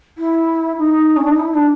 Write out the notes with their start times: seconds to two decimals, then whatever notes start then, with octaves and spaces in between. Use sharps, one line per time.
0.17 E4
0.77 D#4
1.16 C#4
1.23 D4
1.31 D#4
1.38 E4
1.53 D4